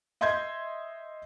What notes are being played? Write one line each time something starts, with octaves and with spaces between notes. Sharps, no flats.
D#5 E5 C6 G6 G#6